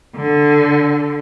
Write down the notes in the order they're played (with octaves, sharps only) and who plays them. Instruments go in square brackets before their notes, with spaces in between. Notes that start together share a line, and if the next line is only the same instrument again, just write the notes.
[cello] D3